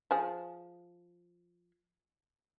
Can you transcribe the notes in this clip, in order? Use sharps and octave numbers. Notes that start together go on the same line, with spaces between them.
F3 G#4